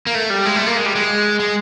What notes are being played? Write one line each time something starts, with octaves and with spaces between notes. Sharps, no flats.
A#3
A3
G3
G#3
A3
A#3
G#3
G3
G#3
G#3